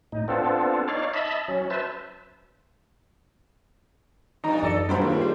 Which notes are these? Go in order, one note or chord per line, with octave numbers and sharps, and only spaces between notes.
A2 D#4
B3 C4 D4 F4 A4
D#4 C#5 D5 F5
D#5 E5 A5 B5
F#3 C#4
B4 C5 E5 A5
E2 G2 D#4 A#5
F#2 A4 D5 D#5
G2 F#3 B3 D4 C5 B5
D#2 G#2 A#3 F4
G3 C5